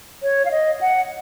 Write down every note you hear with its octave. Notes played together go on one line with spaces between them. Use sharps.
C#5
F5
D#5
F#5